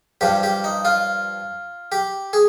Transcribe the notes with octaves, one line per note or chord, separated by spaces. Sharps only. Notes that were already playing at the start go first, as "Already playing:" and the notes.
G2 F3 G4
G4
D#4
F4
G4
G#4